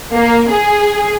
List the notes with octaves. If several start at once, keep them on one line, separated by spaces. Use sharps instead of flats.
A#3
G#4